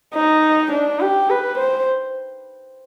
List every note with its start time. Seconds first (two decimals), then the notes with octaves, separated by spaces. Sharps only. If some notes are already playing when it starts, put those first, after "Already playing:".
0.14 D#4
0.72 D4
1.00 G4
1.30 B4
1.58 C5